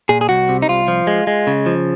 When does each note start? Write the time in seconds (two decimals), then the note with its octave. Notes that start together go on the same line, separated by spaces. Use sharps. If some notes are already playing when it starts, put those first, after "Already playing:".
0.09 A#2 G#4
0.21 G#4
0.29 C2 F#4
0.49 C3
0.62 D#4
0.69 C2 F4
0.88 F3
1.07 G#3
1.27 G#3
1.47 C#3
1.66 F3